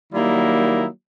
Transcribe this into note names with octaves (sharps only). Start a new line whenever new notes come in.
D#3 F#3 G3 A#3 D#4 E4